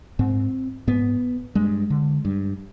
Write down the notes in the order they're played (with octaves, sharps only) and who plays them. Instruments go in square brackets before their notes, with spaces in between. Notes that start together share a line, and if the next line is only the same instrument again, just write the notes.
[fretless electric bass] G#2 C4
G#2 B3
G2 G#3
D3
G2